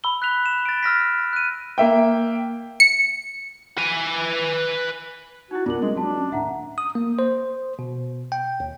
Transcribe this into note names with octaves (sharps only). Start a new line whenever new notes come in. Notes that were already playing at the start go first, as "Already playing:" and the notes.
B5 E6 G7
F#6 B6 F7
E7
A6 D7
E6 F6 A#6 B6
F#6 D#7
A#3 E5 G5
C#7
B4 G#5
D#4 E4 F#4
C2 G2 B3 D4 F4 A#4 F#7
G3 G#3 C4 C#4
F#3 D4 F#4 A5
C#4
D#1 A2 E5 F#5 A#5
D#6
A#3
C5
B2
G5
D#2